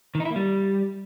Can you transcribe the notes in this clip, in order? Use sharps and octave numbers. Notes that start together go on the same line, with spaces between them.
D#3
D#4
E4
A#3
G3